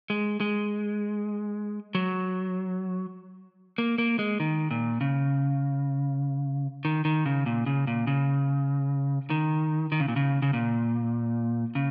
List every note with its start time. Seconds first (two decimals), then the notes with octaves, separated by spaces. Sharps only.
0.10 G#3
0.40 G#3
1.95 F#3
3.78 A#3
3.98 A#3
4.19 G#3
4.40 D#3
4.71 A#2
5.01 C#3
6.85 D#3
7.05 D#3
7.26 C#3
7.46 A#2
7.66 C#3
7.87 A#2
8.07 C#3
9.30 D#3
9.92 D#3
10.00 C#3
10.08 A#2
10.16 C#3
10.42 C#3
10.53 A#2
11.75 C#3